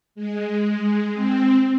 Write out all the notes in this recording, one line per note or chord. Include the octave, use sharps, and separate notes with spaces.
G#3
C4